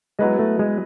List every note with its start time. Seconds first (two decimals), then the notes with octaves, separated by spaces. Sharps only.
0.19 F#3 G#3 B3 E4 B4 D#5
0.39 A3
0.59 G#3